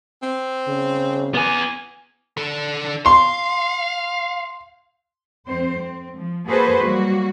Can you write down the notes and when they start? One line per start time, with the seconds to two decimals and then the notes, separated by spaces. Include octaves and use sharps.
0.22 C4
0.68 C#3
1.35 B3 G#5
2.37 D3 A4
3.06 F5 C6
5.46 F2 C4 C5
5.79 C4
6.15 F3
6.47 A#3 F#4 G#4 A4 B4 C5
6.80 F#3 G3 A#3 F#4